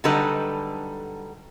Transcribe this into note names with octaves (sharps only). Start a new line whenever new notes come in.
D3 F#3 G3 D#4 A4 B4